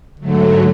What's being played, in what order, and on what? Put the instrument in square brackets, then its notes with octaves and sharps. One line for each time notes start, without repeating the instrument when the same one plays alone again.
[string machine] G#2 F#3 A3 [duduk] D3